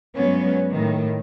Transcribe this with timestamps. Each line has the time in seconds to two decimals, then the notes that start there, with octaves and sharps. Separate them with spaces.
0.16 G2 F#3 G#3 B3 C#4
0.70 A2 D#3